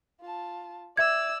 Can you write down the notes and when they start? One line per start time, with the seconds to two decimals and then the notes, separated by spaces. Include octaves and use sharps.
0.21 F4 A5
0.97 D5 E5 E6 G#6